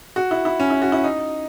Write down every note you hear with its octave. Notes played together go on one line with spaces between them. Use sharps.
F#4
E4
E4
C#4
E4
F#4
E4
D#4